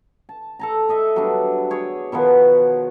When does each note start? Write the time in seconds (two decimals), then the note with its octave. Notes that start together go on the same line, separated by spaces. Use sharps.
0.29 A5
0.59 A4 A5 A#5
0.89 A4 D#5 E5
1.16 F#3 G3 B3 D4
1.70 G#4 C#5 D5
2.12 B2 D#3 F3 B3